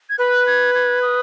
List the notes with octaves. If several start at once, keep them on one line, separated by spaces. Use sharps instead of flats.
G#6
B4 F#6
G#6
G#6
D#6